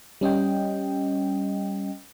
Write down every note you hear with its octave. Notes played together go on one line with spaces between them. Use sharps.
G3 C#4 D#5 G5